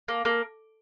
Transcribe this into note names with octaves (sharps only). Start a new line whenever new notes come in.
A#3
A#3